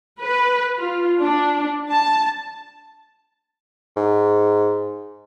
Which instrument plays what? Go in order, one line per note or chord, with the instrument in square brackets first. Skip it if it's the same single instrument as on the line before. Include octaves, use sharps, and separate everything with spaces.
[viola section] B4
F4
D4
A5
[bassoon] G#2